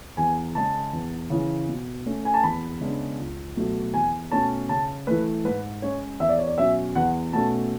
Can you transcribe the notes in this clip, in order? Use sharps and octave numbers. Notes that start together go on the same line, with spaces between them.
E2 G#5
C#3 G#3 A5
E2
C#3 E3
B2
A3 C#4
G#5
A5
E2 B5
C#3 G#3 B3 D4
C#2
B2 F#3 A3
E2 G#5
B2 A3 C#4 A5
C#3 A5
E3 A3 B4
G#2 B4
G#3 C#4 C#5
E2 E5
D5
C#5
D5
B2 F#3 C#4 E5
E2 F#5
B2 A3 C#4 A5